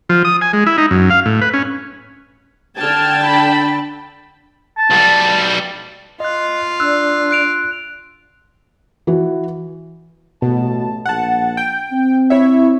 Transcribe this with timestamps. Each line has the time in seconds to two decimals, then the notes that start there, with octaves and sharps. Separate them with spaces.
0.09 F3
0.25 D#6
0.41 G#5
0.53 G#3
0.66 E4
0.78 D#4
0.91 F#2
1.10 F5
1.26 A2
1.42 B4
1.54 C#4
2.78 D3 G5 A5 F6 G#6
3.24 B5
4.78 A5
4.91 B1 G3
6.20 F4 D#5 F5 F#6
6.80 D4 E6 F#6
7.31 F#6 D7 F7
9.07 E3 F#4
10.42 A1 B2 A3 A5
11.06 A#1 F#5 A5
11.57 G5
11.92 C4
12.30 E4 C#5 E5